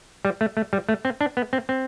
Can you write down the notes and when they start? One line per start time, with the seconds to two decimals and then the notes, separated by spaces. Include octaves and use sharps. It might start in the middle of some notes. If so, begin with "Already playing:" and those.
0.25 G3
0.41 A3
0.57 A3
0.73 G3
0.89 A3
1.05 C4
1.21 D4
1.37 B3
1.53 C4
1.69 C4